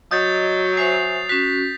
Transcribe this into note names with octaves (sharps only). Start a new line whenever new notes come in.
F#3 D#5 D#6 G6 A6
C5 E5 G#5 C7 F7
C#4 F#4 B6